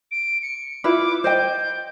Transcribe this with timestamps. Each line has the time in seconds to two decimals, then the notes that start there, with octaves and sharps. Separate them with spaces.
0.11 D7
0.43 C#7
0.84 E4 F4 B4 D6
1.24 C5 D#5 G5 G6